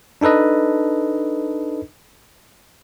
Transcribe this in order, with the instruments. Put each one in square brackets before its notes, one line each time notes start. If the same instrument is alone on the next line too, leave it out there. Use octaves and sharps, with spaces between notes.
[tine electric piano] D4 D#4 A4 B4 D#5